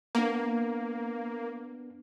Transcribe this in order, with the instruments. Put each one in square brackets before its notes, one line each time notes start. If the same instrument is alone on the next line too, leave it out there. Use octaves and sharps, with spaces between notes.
[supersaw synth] A#3 [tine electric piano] B3 D4